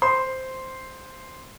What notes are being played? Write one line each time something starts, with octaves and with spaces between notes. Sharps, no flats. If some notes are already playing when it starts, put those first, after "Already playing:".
C5 C6